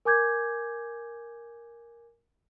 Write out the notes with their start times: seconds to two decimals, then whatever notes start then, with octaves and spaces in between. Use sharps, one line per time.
0.05 A#4 G#5 D6 G6 G#6